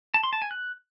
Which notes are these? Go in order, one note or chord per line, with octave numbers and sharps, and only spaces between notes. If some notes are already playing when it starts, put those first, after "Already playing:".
A5
C6
A5
G#5
F#6